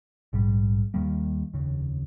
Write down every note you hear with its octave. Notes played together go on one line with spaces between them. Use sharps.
A#1 G#2 G3
D#2 D#3 G3 A#3
F1 D#2 C#3